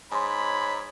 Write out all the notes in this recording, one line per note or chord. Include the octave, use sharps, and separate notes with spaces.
G#2 C#5 G#5 B5 C6